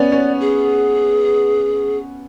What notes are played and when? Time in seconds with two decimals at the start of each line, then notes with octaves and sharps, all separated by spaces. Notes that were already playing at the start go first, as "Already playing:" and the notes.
Already playing: B3 C#4 D5
0.12 C#4
0.40 G#4